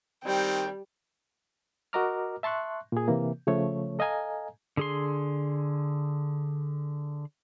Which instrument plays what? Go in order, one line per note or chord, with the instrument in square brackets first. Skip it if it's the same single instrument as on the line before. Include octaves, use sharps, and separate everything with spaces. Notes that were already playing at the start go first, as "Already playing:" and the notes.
[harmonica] D#3 C4 [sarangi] G3 [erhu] G5
[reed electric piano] F#4 A#4 D#5 A#5 D6 F6
E5 A5 C6 C#6 F#6
A#2 G#4
C3 E3 A#3
C#3 F3 A3 C#5
A4 D#5 F5 G#5 A#5
[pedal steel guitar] D3 G#4 C6